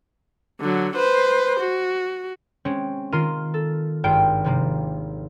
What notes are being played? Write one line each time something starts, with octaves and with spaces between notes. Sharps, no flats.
D3 F#3
B4 C5
F#4
G#3 C4 C#4
D#3 F4 A#4 C6 D#7
A4
G#1 G2 D#3 F4 G5 D7
C3 F3 A#3